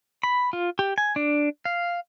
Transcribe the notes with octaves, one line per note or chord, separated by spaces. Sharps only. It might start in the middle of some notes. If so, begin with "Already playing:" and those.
B5
F4
G4
G#5
D4
F5